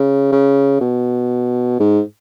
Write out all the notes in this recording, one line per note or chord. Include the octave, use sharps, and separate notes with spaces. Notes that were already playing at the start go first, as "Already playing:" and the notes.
Already playing: C#3
C#3
B2
G#2